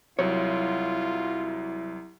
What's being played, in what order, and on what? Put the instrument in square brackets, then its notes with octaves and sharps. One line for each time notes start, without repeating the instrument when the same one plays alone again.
[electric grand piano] C2 F#3 [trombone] E4 [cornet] F4 [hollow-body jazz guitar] C#5